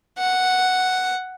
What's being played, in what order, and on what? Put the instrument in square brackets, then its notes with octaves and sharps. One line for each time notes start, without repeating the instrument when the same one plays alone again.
[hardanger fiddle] F#5